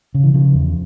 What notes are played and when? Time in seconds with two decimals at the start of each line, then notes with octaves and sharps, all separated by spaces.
0.15 C#3
0.23 E3
0.34 C#3 F3
0.54 E2